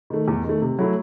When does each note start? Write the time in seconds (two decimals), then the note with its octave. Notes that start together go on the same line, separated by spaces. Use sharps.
0.10 D#3 A3
0.28 E2
0.44 D#3 A3
0.62 C3
0.79 F#3 A3 E4